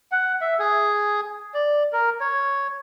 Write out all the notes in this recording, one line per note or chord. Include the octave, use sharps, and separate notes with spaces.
F#5
E5
G#4
D5
A#4
C#5